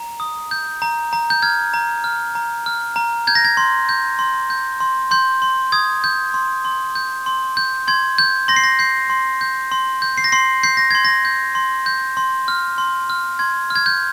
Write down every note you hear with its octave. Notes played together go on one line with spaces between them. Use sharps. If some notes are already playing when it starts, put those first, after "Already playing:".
Already playing: A#5
D#6
G6
A#5
A#5
G6
F6 G#6
A#5
F6
A#5
F6
A#5
G6 G#6
A#6
G#6
C6
G6
C6
G6
C6
C6 G6
C6
D#6 G#6
G6
C6
C6
G6
C6
G6
C6 G#6
G6
C6 A#6
C7
A#6
G6 C7
C6
G6
C6
G6
C7
A#6
C6 C7
G6 C7
A#6
C6 G#6
A#6
G6
C6
G6
C6
F6
C6
F6
C6 G#6
F6
G#6
G6